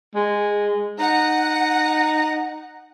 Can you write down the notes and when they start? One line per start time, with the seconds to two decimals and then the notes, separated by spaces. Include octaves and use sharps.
0.15 G#3
0.99 D#4 F#5